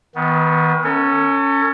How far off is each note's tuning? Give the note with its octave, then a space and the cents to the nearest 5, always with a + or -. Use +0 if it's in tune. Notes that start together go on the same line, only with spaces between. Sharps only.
D#3 +35 B3 +0
C#4 +0 A4 +40